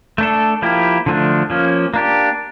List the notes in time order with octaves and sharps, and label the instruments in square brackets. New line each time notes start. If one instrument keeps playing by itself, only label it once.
[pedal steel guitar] A3 D4 A4
F3 A#3 E4 G4
D3 F3 A3 D4
F3 A#3 C#4
A#3 D4 G4